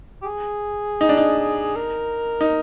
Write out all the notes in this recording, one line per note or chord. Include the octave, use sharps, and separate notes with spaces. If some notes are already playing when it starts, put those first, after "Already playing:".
G4
G#4
D#4
D4
D#4
A#4
D#4